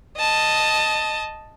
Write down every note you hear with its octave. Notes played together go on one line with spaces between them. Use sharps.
D#5 A5